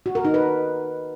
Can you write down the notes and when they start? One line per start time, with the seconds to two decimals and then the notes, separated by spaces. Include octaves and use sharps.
0.06 F#4
0.15 A#4
0.25 D#4
0.34 B4